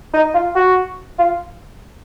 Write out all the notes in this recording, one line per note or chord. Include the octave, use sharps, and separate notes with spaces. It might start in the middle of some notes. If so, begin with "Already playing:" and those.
D#4
F4
F#4
F4